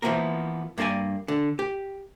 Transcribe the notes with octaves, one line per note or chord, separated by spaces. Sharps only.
E3 F3 G#3 A#3 B3 A#4
G2 A#3 F#4 D5 G#5
D3
G4